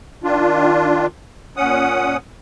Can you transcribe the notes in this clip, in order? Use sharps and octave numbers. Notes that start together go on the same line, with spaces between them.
D#3 D4 F4
A#2 C#4 F#5 D#6